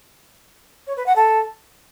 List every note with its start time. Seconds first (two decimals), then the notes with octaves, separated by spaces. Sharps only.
0.87 C#5
0.97 B4
1.06 F#5
1.16 A4